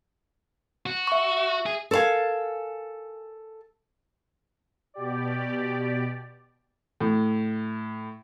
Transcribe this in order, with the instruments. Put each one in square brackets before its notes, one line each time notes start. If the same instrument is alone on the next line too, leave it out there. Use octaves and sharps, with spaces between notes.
[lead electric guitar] F#4
[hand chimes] E5 C#6
E5
[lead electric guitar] G#4
[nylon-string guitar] A4 A#4 C5 F5 G#5
[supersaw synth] B2 G4 D5
[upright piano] A2